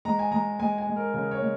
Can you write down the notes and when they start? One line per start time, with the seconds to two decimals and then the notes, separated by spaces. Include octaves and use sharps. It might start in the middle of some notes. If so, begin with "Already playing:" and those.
0.05 G#3 A#5
0.19 G#5
0.31 G#3 A#5
0.59 G#3 G#5
0.78 G#5
0.87 G#3
0.96 A#4
1.14 C#3 A#4
1.31 C#5
1.41 G#3